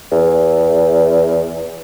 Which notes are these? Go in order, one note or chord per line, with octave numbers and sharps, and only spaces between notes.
E2